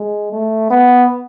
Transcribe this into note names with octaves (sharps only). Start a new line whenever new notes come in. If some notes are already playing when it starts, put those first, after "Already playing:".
Already playing: G#3
A3
B3